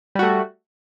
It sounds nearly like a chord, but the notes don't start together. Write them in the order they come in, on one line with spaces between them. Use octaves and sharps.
G3 F#4 A3